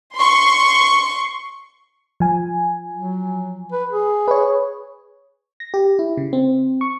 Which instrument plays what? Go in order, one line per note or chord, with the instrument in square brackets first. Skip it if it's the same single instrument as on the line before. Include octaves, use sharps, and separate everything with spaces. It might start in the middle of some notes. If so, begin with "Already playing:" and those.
[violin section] C6 C#6
[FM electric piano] F3 G#5
[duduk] F#3
B4
G#4
[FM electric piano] B4 C#5
A#6
G4
E4
C#3
C4
C#6